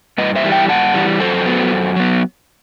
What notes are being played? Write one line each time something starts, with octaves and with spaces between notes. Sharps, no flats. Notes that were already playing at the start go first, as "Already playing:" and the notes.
G2 B4 D#5
C5 E5
E3 G3
E5 G5
G2 F#5 A5
E3 G3
F#2 A4 C5
F#3 B3
F#2
F#3 B3